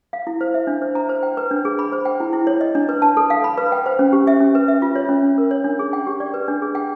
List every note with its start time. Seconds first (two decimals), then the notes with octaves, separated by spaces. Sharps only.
0.13 F5
0.27 E4
0.41 C5
0.54 E5
0.67 D4
0.82 C5
0.95 A#5
1.09 C5
1.23 G5
1.37 B4
1.51 D4
1.65 G#4
1.79 B5
1.92 C5
2.05 G5
2.20 E4
2.33 E4
2.47 C#5
2.61 D#5
2.75 D4
2.89 B4
3.02 A5
3.17 A4
3.30 F5
3.44 B5
3.58 B4
3.72 G5
3.86 C5
3.99 C#4
4.13 G4
4.27 E5
4.40 C#4
4.55 B4
4.68 E5
4.82 F4
4.96 C#5
5.09 C#4
5.23 C#4
5.38 A#4
5.51 C#5
5.64 D4
5.79 G#4
5.93 G5
6.07 G4
6.20 D5
6.34 B4
6.48 D4
6.62 G#4
6.75 G5